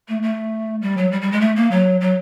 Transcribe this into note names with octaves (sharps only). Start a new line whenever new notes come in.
A3
A3
G3
F#3
G3
G3
G#3
A3
A#3
F#3
F#3